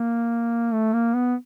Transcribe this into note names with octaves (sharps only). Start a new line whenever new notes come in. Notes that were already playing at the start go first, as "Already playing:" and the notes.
Already playing: A#3
A3
A#3
B3